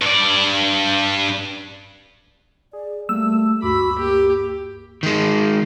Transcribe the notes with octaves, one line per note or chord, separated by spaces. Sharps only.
G2 D5
G#4 D5
G3 A3 A#3 E6
D2 G2 F#4 B5 D6
A#3 G4
D#3 G#3